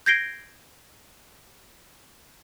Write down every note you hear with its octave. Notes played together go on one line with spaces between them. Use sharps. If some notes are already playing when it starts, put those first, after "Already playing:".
G6 G#6 A#6 C7 D7 G7